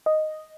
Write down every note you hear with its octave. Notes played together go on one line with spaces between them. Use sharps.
D#5